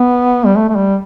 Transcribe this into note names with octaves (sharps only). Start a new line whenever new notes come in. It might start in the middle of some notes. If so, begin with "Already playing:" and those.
Already playing: B3
G3
A3
A3
G3